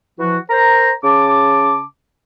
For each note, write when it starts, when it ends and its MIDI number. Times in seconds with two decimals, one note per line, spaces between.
0.19 0.38 52
0.19 0.38 53
0.19 0.38 66
0.50 0.92 70
0.50 0.92 72
0.50 0.92 82
1.04 1.83 49
1.04 1.83 81
1.04 1.83 86